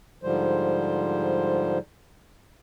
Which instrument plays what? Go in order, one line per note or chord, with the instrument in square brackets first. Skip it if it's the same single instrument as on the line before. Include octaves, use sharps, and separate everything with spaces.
[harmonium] G#2 D3 F3 G3 C5